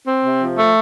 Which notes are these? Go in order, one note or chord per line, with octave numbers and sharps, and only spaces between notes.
C4
C3
F3
A3